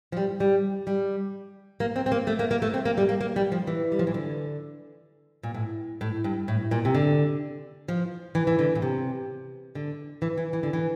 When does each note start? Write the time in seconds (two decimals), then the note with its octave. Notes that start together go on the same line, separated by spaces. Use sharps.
0.12 F3
0.17 G3
0.40 G3
0.87 G3
1.80 A#3
1.96 C4
2.06 C4
2.12 A#3
2.27 A3
2.39 A#3
2.51 A#3
2.62 A3
2.74 C4
2.85 A#3
2.98 G3
3.09 A#3
3.21 A#3
3.36 G3
3.52 F3
3.67 E3
3.92 G3
3.99 F3
4.07 E3
4.14 D3
5.43 A#2
5.54 A2
6.01 A2
6.24 G2
6.48 A2
6.71 A#2
6.85 C3
6.95 D3
7.88 F3
8.35 E3
8.47 E3
8.59 D3
8.75 A#2
8.82 C3
9.75 D3
10.22 E3
10.37 E3
10.53 E3
10.63 D3
10.73 E3